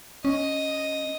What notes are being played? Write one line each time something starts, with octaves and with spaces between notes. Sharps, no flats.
C#4 D#5